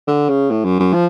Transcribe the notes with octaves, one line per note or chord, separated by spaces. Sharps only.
D3
C#3
A2
F#2
F#2
F3